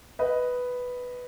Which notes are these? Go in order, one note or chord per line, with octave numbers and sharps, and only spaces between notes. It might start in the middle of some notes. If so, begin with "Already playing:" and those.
B4 D#5